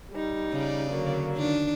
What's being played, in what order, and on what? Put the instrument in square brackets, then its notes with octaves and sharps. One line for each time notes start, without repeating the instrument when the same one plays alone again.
[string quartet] G3 D#4
[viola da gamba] C#3 D5
[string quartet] D3 F#3 A#3
[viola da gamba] D#3 D4